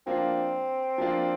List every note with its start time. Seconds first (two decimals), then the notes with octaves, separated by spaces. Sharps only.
0.07 F3 A#3 C4 D4 F4
0.98 F3 A#3 D4 F4